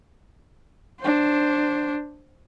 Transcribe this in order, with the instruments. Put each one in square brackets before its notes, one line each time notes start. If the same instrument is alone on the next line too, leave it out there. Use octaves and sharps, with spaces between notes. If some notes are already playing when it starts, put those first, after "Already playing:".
[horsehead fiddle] D4 C5